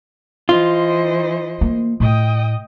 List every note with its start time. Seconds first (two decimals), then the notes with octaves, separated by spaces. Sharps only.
0.49 E3 F4 C5 D#5
1.61 A#3
2.00 A2 D#5 G5 D#6